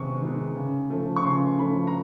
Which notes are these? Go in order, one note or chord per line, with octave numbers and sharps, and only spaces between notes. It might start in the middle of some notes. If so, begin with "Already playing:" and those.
Already playing: C3 D#3 G#3 B3 C#6
D#3 G#3 B3
C#3
F3 A3
C#6
C#3 C6
F3 A3 B5
A#5